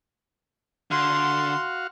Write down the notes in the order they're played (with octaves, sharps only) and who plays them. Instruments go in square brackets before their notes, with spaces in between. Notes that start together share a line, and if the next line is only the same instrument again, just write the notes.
[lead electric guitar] D3 [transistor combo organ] F#4 F5 [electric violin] C6